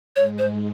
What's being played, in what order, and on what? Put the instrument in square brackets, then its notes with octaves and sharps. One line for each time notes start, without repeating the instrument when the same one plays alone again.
[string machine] G#2 G#3 [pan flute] C#5
[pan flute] C5